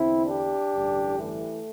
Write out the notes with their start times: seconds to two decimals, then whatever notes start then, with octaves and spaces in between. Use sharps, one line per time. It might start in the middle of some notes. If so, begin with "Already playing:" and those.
Already playing: E2 D3 C4 E4
0.27 D4 G4
0.72 A1 G2 D3
1.18 E3 A3